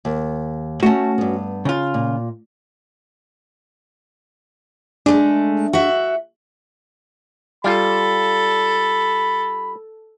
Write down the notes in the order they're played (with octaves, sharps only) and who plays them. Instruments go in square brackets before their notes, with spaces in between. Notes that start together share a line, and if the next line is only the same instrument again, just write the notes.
[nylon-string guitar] D#2
[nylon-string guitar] A3 A5 [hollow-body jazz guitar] C#4 F#4
[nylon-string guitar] G2 B3
[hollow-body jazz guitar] C#3 F4
[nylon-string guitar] A#2
[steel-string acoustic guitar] G#3 A3 [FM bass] D4
[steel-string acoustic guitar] F#4 E5
[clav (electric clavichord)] G3 F4 [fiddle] A4 [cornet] B5